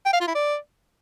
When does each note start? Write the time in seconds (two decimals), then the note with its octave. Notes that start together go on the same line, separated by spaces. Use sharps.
0.06 G5
0.13 F5
0.20 F4
0.28 E4
0.35 D5